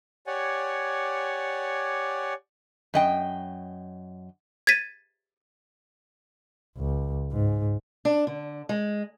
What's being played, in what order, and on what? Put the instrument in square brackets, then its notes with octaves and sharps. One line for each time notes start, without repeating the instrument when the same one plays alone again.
[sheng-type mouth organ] G4 C#5 D5 F#5 G#5
[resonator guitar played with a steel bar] F#2 D#5 G5
[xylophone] G#6 A6 B6 D#7
[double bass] C#2
G#2
[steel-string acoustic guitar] D4
D3
G#3